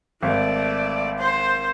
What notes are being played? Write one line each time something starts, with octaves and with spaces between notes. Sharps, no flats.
G#1 A3 D5
C5